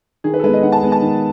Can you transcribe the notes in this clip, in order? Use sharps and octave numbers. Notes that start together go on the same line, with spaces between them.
D#3 G#4
B4
A4
G#3 B3 B4
D#5
D#3 F#5
A5
G#3 B3
A5
D#3